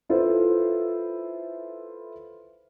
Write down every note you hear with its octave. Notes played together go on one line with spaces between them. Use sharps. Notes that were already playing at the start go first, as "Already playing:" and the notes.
E4 F4 A4 B4 C5